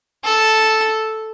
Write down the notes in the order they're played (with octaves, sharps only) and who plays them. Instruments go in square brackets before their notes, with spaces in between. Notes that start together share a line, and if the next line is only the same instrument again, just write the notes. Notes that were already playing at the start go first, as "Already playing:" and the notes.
[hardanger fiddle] A4